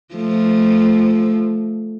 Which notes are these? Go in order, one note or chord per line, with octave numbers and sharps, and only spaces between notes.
F3 A3